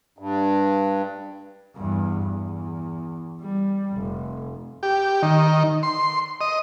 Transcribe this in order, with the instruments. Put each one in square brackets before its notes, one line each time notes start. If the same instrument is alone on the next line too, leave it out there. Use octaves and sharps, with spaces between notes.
[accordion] G2
[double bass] E2 G2
E2
G3
F1
[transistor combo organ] G4
D#3
C6
D#5